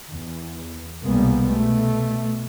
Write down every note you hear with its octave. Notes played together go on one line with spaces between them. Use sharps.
E2
C2 B2 G3 G#3 A#3 B3
B2 A3